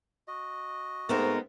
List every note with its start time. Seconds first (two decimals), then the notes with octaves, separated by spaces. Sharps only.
0.28 F#4 D#5
1.09 G#2 G#3 A3 B3 C4 D#4 A#4